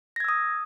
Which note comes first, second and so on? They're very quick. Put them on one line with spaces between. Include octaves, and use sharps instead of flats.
A#6 G#6 E6 D#6